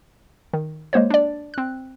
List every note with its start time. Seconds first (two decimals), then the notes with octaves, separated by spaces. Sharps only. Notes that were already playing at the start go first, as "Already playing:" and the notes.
0.53 D#3
0.93 G#3 A#3 C5 C#5
1.10 D4 D5
1.54 C4 F#6